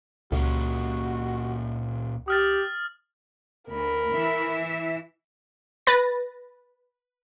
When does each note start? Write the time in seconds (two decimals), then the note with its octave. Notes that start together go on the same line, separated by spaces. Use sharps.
0.32 C#2 A#2 A#3 C#4 F#4
2.28 G4 D#6 F6 A6
3.69 D2 A#4 B5
4.12 E3 E5
5.87 B4 A6 A#6